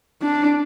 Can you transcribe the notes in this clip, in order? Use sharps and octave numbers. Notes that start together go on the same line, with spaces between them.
D4